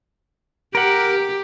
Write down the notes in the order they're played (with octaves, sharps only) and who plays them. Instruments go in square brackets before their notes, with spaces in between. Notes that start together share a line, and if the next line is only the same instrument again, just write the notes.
[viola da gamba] G4 [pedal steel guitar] A#4 F#5